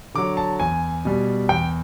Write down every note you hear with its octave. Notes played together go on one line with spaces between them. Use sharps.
D3 F#3 D6
A5
E2 G#5
B2 G3
E2 G5